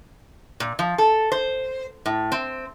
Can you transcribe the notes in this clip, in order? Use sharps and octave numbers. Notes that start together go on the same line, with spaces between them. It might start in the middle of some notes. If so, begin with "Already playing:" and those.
A#2
F3
A4
C5
A2
C4